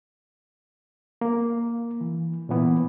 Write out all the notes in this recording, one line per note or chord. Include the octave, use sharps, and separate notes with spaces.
A#3
E3
A#2 E3 B3